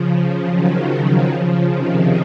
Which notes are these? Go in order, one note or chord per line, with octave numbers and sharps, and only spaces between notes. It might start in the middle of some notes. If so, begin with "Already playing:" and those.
Already playing: C#3 F3
D#3 F#3
C#3 F3
C3 D#3